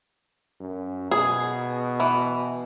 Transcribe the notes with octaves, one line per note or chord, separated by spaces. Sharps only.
F#2
B2 G#4
E3